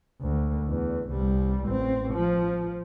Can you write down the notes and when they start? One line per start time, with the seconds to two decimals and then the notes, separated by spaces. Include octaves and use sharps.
0.21 D2
0.68 E2
1.09 C2 G3
1.65 A1 C4
2.14 F3